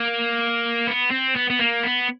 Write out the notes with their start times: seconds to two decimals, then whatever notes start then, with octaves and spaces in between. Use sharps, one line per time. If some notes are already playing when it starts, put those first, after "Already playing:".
Already playing: A#3
0.88 B3
1.11 C4
1.36 B3
1.50 B3
1.59 A#3
1.83 B3